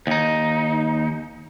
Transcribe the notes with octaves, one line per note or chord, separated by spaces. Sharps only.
D#2 D#4